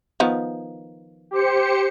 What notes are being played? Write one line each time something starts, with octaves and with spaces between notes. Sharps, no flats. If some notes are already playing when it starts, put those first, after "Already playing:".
D#3 F3 B3
G4 C5 C#7